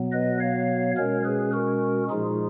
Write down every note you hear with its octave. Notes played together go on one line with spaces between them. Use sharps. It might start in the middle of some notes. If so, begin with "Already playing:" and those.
Already playing: B2 F#3 B3
B4 D#5
C#5 F5
B2 G#3 C#4 A#4 C#5
G#4 B4
F#4 A#4
A#2 F3 G#3 D#4 F4 G#4